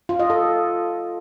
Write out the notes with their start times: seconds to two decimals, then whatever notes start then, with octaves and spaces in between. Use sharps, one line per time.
0.09 F4
0.19 D#5
0.30 A4